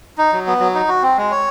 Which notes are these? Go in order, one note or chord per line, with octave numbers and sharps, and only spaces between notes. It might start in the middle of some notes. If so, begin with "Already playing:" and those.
D#4
F#3
B3
F#3
D#4
F#4
C4
G#3
C#5